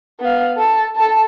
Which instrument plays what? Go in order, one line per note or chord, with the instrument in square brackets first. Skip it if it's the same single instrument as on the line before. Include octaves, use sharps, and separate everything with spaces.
[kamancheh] B3 F5
A4 A5
A4 A5